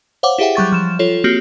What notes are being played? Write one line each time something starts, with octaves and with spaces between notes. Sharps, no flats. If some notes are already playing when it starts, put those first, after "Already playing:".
C5 C#5 F5 F#5 D6
E4 G4 G#4 E5 F#5 G5
F#3 G3 C#6 A6
F3 E7
F4 A4 C#5
A#3 C4 F#4 G4